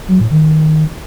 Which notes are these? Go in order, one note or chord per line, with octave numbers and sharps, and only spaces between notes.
F#3
A2
D#3